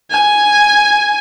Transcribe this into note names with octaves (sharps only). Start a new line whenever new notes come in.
G#5